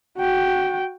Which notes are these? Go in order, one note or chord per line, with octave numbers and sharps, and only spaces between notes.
F#4 G5